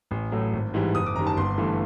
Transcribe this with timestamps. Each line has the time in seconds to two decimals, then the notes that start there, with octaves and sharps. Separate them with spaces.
0.11 A1
0.32 A2 F#3 A3
0.53 G#1
0.74 G#2 E3 G3
0.95 F#1 D#6
1.06 D6
1.16 F#2 D#3 G3 A#5
1.27 A5
1.37 G1 C6
1.58 G2 E3 A3